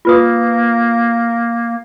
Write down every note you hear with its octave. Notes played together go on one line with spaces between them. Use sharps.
A#3 F4 B4 D#6